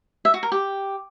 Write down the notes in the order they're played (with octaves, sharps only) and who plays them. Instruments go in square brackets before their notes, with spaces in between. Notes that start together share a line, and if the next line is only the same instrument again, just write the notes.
[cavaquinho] E5
F#4
A#4
G4